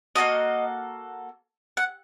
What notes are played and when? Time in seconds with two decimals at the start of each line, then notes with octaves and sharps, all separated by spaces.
0.15 A#3 D4 F#4 A4 D#5
1.77 F#5